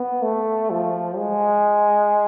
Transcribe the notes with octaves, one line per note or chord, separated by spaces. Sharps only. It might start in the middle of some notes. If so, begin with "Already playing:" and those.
Already playing: B3
A3
F3
G#3